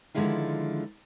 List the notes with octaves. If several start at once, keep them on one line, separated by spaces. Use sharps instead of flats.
D3 D#3 F3 G#3 E4 F4